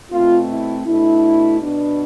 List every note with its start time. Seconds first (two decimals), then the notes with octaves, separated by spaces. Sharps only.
0.11 B2 A3 C4 F4
0.49 E4
0.86 B2 A3 D4 E4
1.61 B2 B3 D4